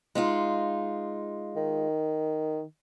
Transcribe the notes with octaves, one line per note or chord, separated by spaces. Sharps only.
G#3 D#4 F4
D#3